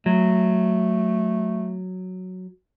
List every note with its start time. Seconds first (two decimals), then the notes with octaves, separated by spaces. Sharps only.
0.06 F#3 A3